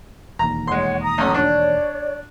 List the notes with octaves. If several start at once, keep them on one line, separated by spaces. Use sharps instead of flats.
E1 D#2 A#5
G#3 C#5 F#5 C6
A#5 D#6
B1 C#4
D4 C#5 D5